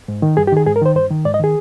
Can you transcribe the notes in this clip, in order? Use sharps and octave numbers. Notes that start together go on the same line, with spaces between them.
G#2
D#3
G2 G#4
G4
D#3 G#4
G#2 G#4
A#4
D#3 C5
G2 C5
D#3
G#2 D5
D#5
D#3 G#4